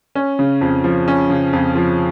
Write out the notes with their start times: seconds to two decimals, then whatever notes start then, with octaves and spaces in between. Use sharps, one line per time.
0.15 C#4
0.39 C#3
0.61 F2
0.84 F3
1.08 C#4
1.30 C#3
1.53 F2
1.75 F3